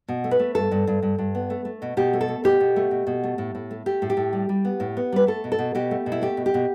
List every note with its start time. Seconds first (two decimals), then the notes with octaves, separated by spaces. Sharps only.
0.08 B2
0.24 A3
0.31 B4
0.39 A3
0.55 G2 A4
0.71 G2
0.87 G2
1.02 G2
1.18 G2
1.35 B3
1.50 A3
1.65 A3
1.82 B2
1.97 B2 G4
2.13 A3
2.21 A4
2.28 A3
2.44 B2 G4
2.60 B2
2.76 A3
2.91 B2
3.07 B2
3.24 A3
3.38 A2
3.55 A2
3.71 A3
3.86 A3 G4
4.02 A2
4.10 G4
4.17 A2
4.33 G3
4.49 G3
4.65 B3
4.80 A2
4.97 B3
5.12 G3 B4
5.27 A3 A4
5.44 B2
5.52 A4
5.59 B2
5.75 B2 G4
5.91 A3
6.06 B2
6.12 E4
6.21 A3 G4
6.37 B2
6.46 G4
6.54 B2